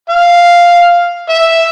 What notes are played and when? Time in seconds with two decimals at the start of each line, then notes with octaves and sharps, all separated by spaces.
0.09 F5
1.29 E5